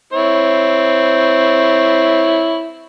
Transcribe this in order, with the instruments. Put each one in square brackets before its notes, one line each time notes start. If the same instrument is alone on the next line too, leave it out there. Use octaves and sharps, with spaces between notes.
[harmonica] C4 E4 C#5